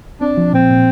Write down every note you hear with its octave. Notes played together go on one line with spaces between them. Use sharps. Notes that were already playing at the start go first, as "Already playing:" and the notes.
C4 D4
F3
A#2 C4
A#2